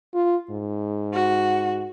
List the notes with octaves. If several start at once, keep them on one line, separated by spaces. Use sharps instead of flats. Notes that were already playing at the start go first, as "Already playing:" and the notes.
F4
G#2
F#4